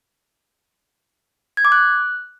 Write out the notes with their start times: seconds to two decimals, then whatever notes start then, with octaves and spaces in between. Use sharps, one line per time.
1.57 G#6
1.65 D6
1.72 F#6